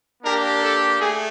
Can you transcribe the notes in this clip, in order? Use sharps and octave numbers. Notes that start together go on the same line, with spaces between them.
A#3 D4 G4 A#4
A4
A3 G#4